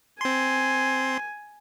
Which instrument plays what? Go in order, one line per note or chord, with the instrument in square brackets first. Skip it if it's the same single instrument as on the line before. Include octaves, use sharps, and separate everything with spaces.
[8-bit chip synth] C4 C6 [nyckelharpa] G#5